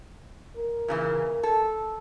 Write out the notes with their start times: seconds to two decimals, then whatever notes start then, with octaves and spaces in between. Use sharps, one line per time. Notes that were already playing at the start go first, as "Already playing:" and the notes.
0.57 A#4
0.88 A#2 C#3 E3
1.43 A4